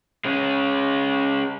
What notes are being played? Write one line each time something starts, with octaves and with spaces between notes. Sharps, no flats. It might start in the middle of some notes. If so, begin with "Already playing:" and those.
G#3 C#4